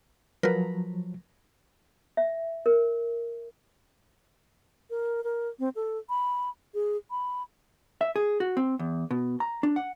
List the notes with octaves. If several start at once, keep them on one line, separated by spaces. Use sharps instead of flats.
F3 F#3 A#4 B4
E5
A#4
A#4
A#4
C4
A4
B5
G#4
B5
E5
G#4
F#4
C4
E2
B2
A#5
D4
F#5